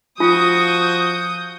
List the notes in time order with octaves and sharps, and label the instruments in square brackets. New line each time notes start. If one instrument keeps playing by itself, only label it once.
[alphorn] F3 [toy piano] F4 [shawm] F#4 [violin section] D#6 G6